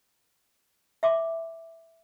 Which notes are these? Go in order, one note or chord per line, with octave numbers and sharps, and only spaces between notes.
E5 C6 D6